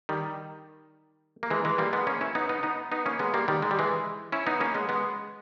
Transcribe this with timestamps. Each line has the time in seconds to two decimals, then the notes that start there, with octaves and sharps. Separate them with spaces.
0.09 D#3 G3
1.43 A#3
1.50 E3 G#3
1.65 E3 G#3
1.78 G3 A#3
1.93 G#3 B3
2.07 A#3 C#4
2.21 C#4 E4
2.35 B3 D#4
2.49 B3 D#4
2.63 B3 D#4
2.92 B3 D#4
3.06 A#3 C#4
3.19 G#3 B3
3.34 G3 A#3
3.48 D#3 G3
3.62 G#3
3.71 G3
3.79 E3 G#3
4.32 C#4 E4
4.47 B3 D#4
4.60 A#3 C#4
4.74 G#3 B3
4.89 G#3 B3